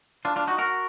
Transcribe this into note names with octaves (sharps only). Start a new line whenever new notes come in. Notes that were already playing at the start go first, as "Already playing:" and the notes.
D4 F4
D4 F4
D#4 F#4
F#4 A#4